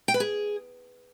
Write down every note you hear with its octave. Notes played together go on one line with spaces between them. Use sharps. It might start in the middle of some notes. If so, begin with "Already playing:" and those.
G5
B4
G#4